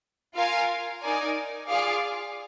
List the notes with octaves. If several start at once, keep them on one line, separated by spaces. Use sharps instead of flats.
F4 A#4 F5 G#5
D#4 A#4 D5 G#5
F4 G#4 D5 F5